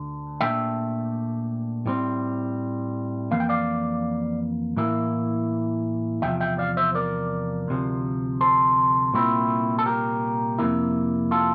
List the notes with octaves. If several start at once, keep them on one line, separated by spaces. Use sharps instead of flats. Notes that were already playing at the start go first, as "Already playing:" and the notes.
Already playing: D2 D3
A#2 A3 D4 E5 G5
A2 G3 C4
F2 E3 A#3 F5
G5
D5 F5
A2 E3 A#3 E4
E2 C3 F3 E5 G5
E5 G5
D5 F5
C5 E5
A#4 D5
D2 C3 F3
A4 C5
C2 A#2 A3 C4 E4
A4
G4 A#4
F2 C3 G3 A#3 E4
F4 A4